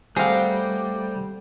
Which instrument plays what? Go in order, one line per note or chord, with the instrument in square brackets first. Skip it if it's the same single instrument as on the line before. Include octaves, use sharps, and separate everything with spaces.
[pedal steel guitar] G3 [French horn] A3 [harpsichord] C4 F#5 A#5 [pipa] G#4 F5